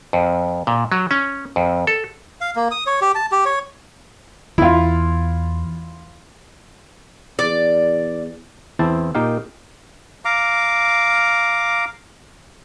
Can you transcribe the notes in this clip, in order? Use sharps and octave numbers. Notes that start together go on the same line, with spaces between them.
F2
A#2
F#3
C#4
F2
A4
F5
A#3
D#6
C#5
G4
A5
G4
C#5
E2 E4 F4
E2 D5
E2 C4 E4 C5 A5
A#2 A#3 D#4 G4 F5
F5 A#5 D6